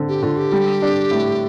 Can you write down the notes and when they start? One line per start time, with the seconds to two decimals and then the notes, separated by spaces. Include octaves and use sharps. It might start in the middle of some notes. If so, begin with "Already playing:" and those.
Already playing: D3 C4
0.08 G4
0.23 D3 F4
0.37 G4
0.52 G3
0.82 D4
1.11 A2